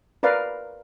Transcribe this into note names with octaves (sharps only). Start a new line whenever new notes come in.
A#4 B4 D5 F5